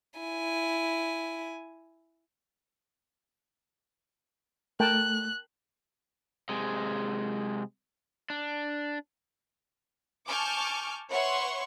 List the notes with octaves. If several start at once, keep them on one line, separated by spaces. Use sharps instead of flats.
E4 G#5
A3 A#4 G5 A5 F#6
C3 G#3
D4
G#5 A5 C#6 D6 F6 G6
B4 C#5 E5 F#5 C6 C#6